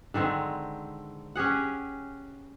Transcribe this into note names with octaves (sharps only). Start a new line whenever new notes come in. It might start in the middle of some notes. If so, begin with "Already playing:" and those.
D3 D#3 G#3 C4
C#4 G4 G#4 F#5